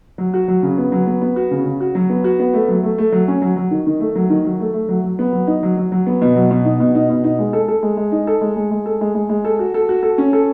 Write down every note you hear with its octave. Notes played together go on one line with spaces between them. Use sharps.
F#3
F#4
F#3
C#3
B3
F#3
B3
B3
F#4
C#3
C#3
F#4
F#3
B3
F#4
B3
A3
F#3
A3
A3
F#3
C#4
F#3
F#3
D#3
D#3
A3
F#3
D#3
F#3
A3
A3
F#3
F#3
B3
F#3
D#4
F#3
F#3
F#3
B3
B2
F#3
B2
D#4
B2
D#4
B2
D#4
G#3
A4
A4
G#3
G#3
D#4
A4
G#3
G#3
G#3
A4
G#3
G#3
G#3
A4
F#4
A4
F#4
A4
C#4
A4